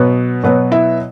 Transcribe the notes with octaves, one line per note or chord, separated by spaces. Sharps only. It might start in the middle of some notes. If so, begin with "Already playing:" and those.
Already playing: B2 F#3 B3 B4
B2 F#3 B3 B4
E4 E5